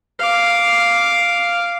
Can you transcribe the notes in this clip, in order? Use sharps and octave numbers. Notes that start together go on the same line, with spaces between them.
F5 D6